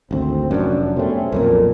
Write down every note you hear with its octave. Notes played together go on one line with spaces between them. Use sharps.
G#1 D2 C4
F1 F#2 C#4 D4
B2 G3 A3 C4 C#4
B1 F2 A#2 A4 A#4